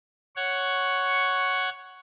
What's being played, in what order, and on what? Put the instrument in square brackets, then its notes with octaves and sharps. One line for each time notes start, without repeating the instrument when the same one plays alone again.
[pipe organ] C#5 F#5 C#6